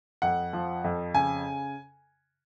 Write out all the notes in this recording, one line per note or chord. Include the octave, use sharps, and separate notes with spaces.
F2 F#5
F3
F2
C#3 G#5